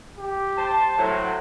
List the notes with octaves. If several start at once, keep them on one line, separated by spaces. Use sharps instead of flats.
G4
C5 A5
A2 F#3 C5